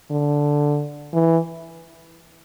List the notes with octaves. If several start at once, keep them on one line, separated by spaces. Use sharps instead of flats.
D3
E3